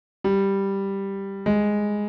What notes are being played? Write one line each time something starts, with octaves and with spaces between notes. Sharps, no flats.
G3
G#3